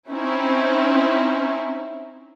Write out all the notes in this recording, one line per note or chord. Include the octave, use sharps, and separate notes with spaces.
C4 C#4 D#4 E4